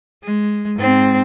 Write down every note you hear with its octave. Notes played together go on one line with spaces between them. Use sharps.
G#3
G#2 C4